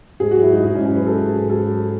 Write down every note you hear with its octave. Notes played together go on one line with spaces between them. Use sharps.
G#2 G#4
F#3 F#4
E4
F#3 D#4
G#2 D#4
G#2 C#4
C#4
F#3 B4
F#3 A4
G#2
G#2
F#3 A4
F#3